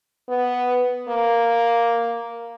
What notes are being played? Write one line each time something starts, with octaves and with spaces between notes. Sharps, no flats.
B3
A#3